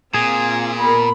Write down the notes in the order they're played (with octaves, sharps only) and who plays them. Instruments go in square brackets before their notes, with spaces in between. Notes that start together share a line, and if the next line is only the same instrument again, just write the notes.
[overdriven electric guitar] A#2 [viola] C4 F4 [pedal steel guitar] G#4
[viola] B3 A#4 [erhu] B5